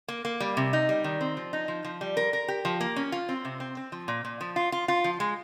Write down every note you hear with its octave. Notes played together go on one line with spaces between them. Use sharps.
A#3
A#3
G3
C3
D#4
G3
D#3
C4
F3
D#4
F3
F3
G3
A#4
A#4
G4
F3
A#3
C#4
F4
C4
C3
C4
C4
F3
A#2
A#2
F3
F4
F4
F4
F3
G#3